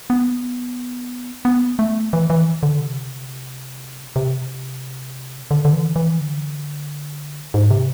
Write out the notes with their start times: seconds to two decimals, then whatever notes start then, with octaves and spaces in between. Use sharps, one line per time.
0.10 B3
1.45 B3
1.79 A3
2.13 E3
2.30 E3
2.63 D3
2.80 C3
4.16 C3
5.51 D3
5.65 D3
5.73 E3
5.96 E3
6.19 D3
7.54 G#2
7.71 C3